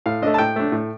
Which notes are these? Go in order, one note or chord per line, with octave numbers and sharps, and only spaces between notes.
A2 F5
A3 D4 D#5
A5
A2 G5
A3 D4
A2